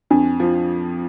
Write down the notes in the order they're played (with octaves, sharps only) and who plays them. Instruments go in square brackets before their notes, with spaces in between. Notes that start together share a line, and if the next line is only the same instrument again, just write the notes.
[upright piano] F2 [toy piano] D4
[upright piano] F3